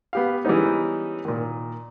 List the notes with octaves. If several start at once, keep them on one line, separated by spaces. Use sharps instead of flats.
B3 G4 F5
E3 G3 G#3 B3 C#4 D#4
A#2 D#3